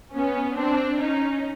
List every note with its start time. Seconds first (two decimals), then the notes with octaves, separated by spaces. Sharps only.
0.13 B3 C#4
0.57 C4 D4
1.01 C#4 D#4